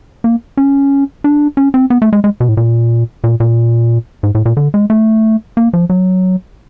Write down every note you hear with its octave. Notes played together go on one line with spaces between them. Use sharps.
A#3
C#4
D4
C#4
C4
B3
A3
G#3
G#3
B2
A2
A#2
A#2
A#2
G#2
A2
A#2
D3
G#3
A3
A#3
F3
F#3